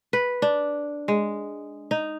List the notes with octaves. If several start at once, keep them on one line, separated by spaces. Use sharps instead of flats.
B4
D4
G#3
D#4